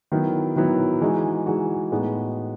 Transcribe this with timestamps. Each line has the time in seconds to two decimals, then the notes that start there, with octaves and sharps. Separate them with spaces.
0.12 D#3 F#3 B3 E4
0.56 D#3 F#3 B3 E4
1.01 E3 G#3 D#4 F#4
1.46 E3 G#3 D#4 F#4
1.91 A2 G#3 B3 D#4 F#4